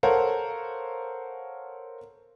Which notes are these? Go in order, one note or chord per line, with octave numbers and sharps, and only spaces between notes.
A4 A#4 C5 C#5 F5 F#5